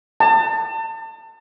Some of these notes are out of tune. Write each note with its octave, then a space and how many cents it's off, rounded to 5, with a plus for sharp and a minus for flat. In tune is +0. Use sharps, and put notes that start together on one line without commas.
A5 +35